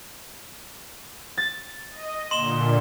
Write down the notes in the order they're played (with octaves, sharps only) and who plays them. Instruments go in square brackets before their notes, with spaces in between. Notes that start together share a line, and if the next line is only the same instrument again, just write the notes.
[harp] A6
[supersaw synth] D#5
[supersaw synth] A#2 D3 [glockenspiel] C6 E7 G7